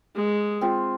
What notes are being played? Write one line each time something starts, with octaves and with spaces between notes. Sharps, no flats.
G#3
C4 F4